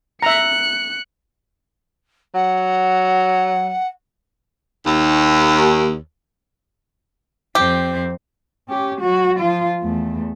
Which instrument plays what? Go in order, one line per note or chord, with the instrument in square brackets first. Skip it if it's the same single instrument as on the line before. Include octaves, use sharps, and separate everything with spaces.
[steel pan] E5 A#5 [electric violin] F#6 C#7
[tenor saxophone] F#3 [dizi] F#5
[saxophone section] D#2
[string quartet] F2 C4 [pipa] G4
[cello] C#4 G4
F#3 F#4
F3 F4
E2 A3